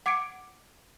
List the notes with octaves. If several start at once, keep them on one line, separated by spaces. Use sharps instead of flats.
F#5 D6 G#6 C#7 D7